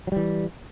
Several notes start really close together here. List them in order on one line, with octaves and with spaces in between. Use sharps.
F#3 G3 E3